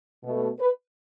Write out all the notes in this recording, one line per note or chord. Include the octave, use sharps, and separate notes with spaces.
B2 A3
B4